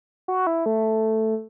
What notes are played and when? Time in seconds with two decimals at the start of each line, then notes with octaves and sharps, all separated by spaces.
0.28 F#4
0.47 E4
0.66 A3